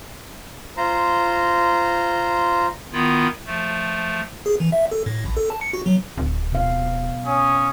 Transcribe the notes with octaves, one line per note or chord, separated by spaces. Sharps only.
F4 C5 A#5
D#3 B3 E4 F4
F3 A3
G#4
E3
E5
A4
A2
A#1
A4
A5
C#7
F#4
F#3
D1
B2 F5
C#4 D#6